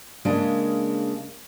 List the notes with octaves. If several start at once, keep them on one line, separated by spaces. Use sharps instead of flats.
C#3 G#3 A#3 D4